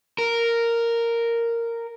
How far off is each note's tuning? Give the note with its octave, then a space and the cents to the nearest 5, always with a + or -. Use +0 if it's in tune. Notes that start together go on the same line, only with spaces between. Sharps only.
A#4 -5